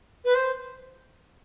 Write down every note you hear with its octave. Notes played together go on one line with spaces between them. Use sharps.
B4
C5